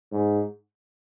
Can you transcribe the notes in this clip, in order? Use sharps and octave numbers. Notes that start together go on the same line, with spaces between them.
G#2